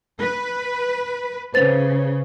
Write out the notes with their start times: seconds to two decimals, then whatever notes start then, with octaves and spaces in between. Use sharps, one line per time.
0.20 B4
1.54 C#3 B4 C5 A6